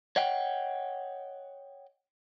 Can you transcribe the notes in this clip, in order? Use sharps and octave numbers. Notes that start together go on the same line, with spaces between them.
C#5 D#5 F#5 G5